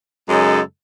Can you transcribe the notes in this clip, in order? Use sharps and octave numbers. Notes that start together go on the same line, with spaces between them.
F#2 C#3 G#3 D#4 A4